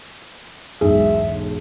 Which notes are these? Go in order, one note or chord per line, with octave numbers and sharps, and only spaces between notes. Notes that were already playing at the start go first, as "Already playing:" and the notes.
E1 B1 G#2 G#4 E5